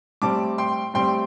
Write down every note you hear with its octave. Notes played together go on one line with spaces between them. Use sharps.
A2 G3 C4 A5 D6
G5 C6
A2 G3 C4 G5 C6